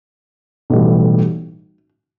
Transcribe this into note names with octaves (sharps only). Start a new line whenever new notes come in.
B1 A2 E3 G3